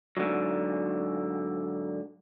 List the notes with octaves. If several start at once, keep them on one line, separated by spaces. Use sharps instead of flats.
G#2 D3 D#3 F#3